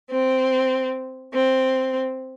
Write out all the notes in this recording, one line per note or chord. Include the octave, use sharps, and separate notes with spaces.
C4
C4